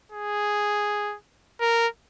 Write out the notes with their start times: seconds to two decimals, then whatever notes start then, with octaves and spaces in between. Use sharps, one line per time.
0.12 G#4
1.61 A#4